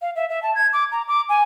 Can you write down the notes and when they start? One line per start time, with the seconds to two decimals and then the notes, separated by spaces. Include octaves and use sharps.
0.02 F5
0.16 E5
0.29 E5
0.43 A5
0.55 G#6
0.73 D6
0.92 A#5
1.08 D6
1.29 G#5